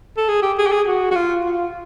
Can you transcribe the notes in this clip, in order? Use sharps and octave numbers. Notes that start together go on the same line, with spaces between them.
A4
G#4
G4
G#4
G4
G#4
F#4
F#4
F4
F4